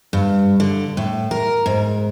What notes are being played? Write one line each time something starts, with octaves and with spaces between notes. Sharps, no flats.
G2
D3
A2
A#4
G#2